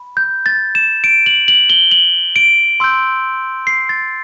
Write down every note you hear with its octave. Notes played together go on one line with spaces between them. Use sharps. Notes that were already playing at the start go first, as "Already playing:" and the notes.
Already playing: B5
G6
A6
E7
D7
F#7
F#7
G7
F#7
D7
C6 E6 G6
C7
A6